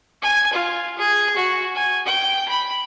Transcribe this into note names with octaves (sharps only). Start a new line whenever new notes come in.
G#5
F4
G#4
F#4
G#5
G5
B5